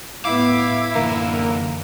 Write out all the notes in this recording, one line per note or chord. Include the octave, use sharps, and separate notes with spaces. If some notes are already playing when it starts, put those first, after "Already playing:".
A2 B3 E4 F5 D6
F#2 D3 E3 A#3